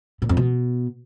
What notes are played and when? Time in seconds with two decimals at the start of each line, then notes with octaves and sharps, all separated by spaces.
0.22 A#2
0.29 F2
0.37 B2